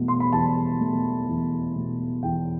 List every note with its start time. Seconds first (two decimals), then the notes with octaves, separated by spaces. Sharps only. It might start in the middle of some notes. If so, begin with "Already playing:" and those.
Already playing: E2 B2 A3
0.08 C6
0.20 B5
0.33 E2 A5
0.81 B2 A3
1.28 E2
1.76 B2 A3
2.23 E2 G5